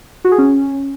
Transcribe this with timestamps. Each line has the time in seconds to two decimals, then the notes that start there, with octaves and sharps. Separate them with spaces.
0.25 F#4
0.31 G#4
0.38 C#4